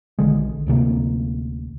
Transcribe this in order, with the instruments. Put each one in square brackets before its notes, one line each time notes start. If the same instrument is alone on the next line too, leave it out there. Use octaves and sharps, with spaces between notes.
[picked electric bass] A#1 D3 D#3 G#3
D1 D2 C3 A#3